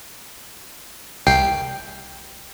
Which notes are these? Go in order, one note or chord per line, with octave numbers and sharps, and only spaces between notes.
C2 G5 C7